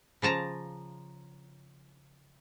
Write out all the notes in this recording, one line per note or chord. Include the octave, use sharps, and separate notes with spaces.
C#3 F3 A5 A#5